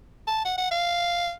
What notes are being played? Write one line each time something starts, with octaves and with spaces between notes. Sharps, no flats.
A5
F#5
F#5
F5